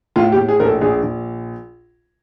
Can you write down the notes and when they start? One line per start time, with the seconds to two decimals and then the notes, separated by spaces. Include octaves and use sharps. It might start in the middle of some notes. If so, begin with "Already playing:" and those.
0.16 A2 F4
0.32 G4
0.37 A2
0.48 G#4
0.59 A#1 A#4
0.65 A4
0.81 A#1 G#4
1.03 A#1